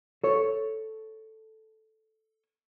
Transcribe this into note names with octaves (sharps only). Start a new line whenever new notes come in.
A4 C#5